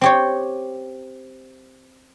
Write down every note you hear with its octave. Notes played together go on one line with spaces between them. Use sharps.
C4 G4 C#5